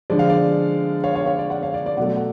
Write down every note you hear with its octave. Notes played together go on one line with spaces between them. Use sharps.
D3 F3 G#3 D5
F5
D5
C#5 F5
C#5 F5
C#5 F5
D5
D5 F#5
C#5 F5
D5
D5
B2 F#3 A3 D5 F#5
F#5